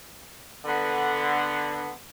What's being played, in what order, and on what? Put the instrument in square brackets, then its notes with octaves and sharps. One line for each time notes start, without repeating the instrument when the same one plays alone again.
[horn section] D3 B3